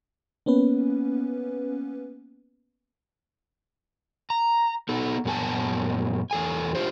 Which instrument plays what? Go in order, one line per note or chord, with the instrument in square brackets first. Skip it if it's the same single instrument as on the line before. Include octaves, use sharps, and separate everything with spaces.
[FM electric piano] A#3 B3 C#4 B4
[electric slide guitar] A#5
B3 D#4 A4
F#2 A#2 B3 A4 G#5 A5
E2 A4 G#5
D4 F4 G4 C5